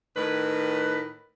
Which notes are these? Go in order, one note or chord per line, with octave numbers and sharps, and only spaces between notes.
A2 D#3 B4